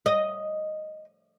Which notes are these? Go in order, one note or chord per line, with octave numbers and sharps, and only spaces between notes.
D#5